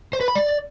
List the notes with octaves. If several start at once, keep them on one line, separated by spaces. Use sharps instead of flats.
C5
B4
B5
D5